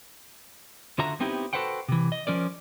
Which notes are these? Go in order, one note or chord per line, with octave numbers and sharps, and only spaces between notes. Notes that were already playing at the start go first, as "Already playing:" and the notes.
D3 F4 F#4 E5 A#5
B3 C4 D#4 E4 G4
F#4 A4 B4 C5 F#5 G5
C3 E3
D#5
F3 C#4 A#4 D5